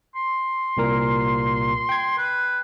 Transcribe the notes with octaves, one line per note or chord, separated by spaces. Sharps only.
C6
C2 A#2 A#4
G5 G#6
B4